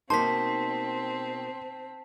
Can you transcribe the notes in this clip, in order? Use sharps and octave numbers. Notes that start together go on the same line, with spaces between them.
B2 A#3 C4 D#4 A5 C6 B6